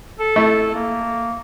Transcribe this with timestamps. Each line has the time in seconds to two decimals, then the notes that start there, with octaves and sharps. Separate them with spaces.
0.20 A4
0.36 A3 E4
0.74 A#3